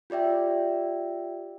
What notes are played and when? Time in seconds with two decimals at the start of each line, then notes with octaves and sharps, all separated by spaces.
0.10 F4 G4 D5 E5 G5